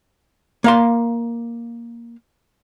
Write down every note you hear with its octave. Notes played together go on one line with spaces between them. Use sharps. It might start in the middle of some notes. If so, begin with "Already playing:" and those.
A#3 F5 C6